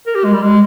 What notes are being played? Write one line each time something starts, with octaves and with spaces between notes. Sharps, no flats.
A#4
G4
G#3
G3
G#3